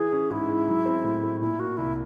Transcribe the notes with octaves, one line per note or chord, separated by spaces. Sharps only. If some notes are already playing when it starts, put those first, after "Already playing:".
Already playing: E3 G#4
C#4
G#2 E4
G#3
F#3
C4
A2
A3
A#2 E4
A#3 F#4
C2 E4